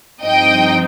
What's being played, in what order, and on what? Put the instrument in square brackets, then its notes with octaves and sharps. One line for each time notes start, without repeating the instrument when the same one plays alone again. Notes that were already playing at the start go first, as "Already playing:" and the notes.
[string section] G2 F3 C4 D#4 D#5 G5